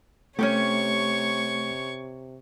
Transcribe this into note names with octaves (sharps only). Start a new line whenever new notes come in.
C3 A3 C#4 D4 G4 C#5 C#6